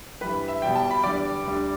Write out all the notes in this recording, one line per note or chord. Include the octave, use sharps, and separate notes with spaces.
G2 E3 G3 B4 B5
E5
E2 B2 G3 G5
A5
B5
E2 D3 G3 D5 D6
D2 D3 G3